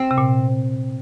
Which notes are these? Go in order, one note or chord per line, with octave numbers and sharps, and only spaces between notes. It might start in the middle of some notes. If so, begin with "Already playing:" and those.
Already playing: C4
C3
A#2